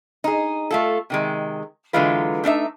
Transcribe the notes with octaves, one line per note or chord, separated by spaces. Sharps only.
D#4 G#4
A3 F4 A4
C3 D#3 G#3
D3 E3 F#3 G#3 F4 B4
A3 D4 D#4 E5